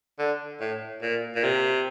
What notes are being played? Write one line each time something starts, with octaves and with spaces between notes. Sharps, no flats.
D3
A2
A#2
A#2
C3